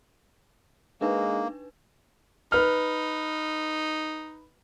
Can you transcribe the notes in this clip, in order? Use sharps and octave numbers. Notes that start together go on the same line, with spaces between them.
G#3 A#3 D4 D#4 B4
D#4 B4 F6